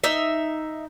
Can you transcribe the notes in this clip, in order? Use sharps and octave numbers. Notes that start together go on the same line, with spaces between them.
D#4 E5